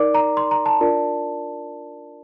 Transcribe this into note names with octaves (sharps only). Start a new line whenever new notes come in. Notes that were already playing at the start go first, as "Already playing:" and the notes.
Already playing: D#4 A#4 D5 D6
A#5
C6
A#5
A5
D4 F4 A#4 D5